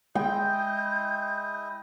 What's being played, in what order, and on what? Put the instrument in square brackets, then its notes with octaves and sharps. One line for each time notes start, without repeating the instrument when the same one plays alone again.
[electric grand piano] G#3 [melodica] E4 D#5 [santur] G5 [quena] G6